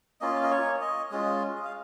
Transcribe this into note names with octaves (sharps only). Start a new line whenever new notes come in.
A#3 C#4 F4 D#5
F5
D#5
C#5
D#5
G#3 C#4 F4 D#5
D#5
F5